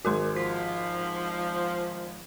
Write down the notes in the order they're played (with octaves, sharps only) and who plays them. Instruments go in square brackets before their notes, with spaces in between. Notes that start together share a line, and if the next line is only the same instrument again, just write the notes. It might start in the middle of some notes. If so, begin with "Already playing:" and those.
[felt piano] G#1 G#4 [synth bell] F#4 A#4 C6
[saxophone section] F3 [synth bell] B6